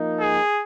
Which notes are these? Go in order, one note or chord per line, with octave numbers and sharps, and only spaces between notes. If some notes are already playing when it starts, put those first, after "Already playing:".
Already playing: F3 A#3 D#4
G#4